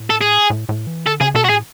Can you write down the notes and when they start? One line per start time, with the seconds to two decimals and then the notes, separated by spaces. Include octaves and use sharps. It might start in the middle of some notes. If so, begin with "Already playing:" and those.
Already playing: A2
0.10 A4
0.21 G#4
0.50 A2
0.69 A2
0.87 E3
1.06 D3 A4
1.21 C#3 G#4
1.34 B2 A4
1.44 F#4
1.49 A2 G#4